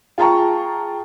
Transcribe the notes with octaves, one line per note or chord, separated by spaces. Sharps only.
F4 G#4 G5 A5 A#5 C#6